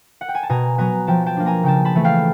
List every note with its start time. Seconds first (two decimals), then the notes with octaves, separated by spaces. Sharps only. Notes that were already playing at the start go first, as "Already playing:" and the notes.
0.21 F#5
0.28 G5
0.35 G#5
0.43 A5
0.50 B2 G#5 A#5
0.78 F#3 B3 G#5 A#5
1.07 F3 G5 A5
1.26 G5 A5
1.37 A#3 D4
1.46 G#5 A#5
1.63 C#3 G5 A5
1.85 A5 B5
1.95 E3 A3
2.04 F5 G5